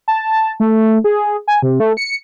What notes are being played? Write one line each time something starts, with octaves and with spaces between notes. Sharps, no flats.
A5
A3
G#4
G#5
C3
A3
C#7